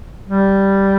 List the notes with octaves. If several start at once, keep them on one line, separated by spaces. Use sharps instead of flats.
G3